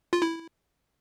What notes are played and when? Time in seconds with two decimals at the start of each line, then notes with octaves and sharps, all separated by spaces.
0.13 F4
0.22 E4